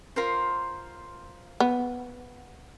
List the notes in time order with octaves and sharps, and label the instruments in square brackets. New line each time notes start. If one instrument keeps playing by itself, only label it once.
[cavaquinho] F4 A#4 C5
[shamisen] B3